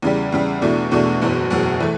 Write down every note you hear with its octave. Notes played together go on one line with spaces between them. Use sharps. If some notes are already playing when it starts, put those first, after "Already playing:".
E2 C#3 G3
E2 C#3 G3
E2 B2 A3 D4 F#4
E2 B2 A3 D4 F#4
F#1 E2 B2 F#3
F#1 E2 B2 F#3
E3 A3